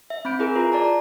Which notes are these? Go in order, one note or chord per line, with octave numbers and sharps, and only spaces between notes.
E5
C4 B5 G6 D7
E4 G#4 A#4
F4 B4 A#5
D5 A5 A#5
A#5